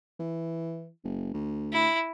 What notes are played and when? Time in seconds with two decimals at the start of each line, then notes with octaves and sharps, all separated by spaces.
0.19 E3
1.04 F#1
1.33 D2
1.73 E4